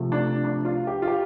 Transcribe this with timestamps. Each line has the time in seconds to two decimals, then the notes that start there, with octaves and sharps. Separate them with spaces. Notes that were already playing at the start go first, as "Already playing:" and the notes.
Already playing: C3 F3 A3
0.12 D4
0.44 D4
0.65 F4
0.87 G4
1.02 F4
1.08 G4